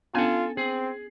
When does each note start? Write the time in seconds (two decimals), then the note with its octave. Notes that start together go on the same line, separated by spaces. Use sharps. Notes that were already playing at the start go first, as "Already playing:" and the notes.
0.14 B3 C#4 D4 F4 A4 G#5
0.57 C4 G#4